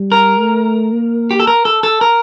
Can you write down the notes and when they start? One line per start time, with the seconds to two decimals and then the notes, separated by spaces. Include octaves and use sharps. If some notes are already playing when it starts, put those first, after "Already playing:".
Already playing: G3
0.12 A#4
0.38 A3
0.93 A#3
1.31 G4
1.40 A4
1.47 A#4
1.65 A4
1.83 A4
2.01 A#4